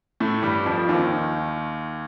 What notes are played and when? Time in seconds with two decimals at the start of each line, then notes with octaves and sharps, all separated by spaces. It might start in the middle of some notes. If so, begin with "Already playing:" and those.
0.20 A2 A3
0.43 G2 G3
0.66 F2 F3
0.78 F3
0.89 D#2 D#3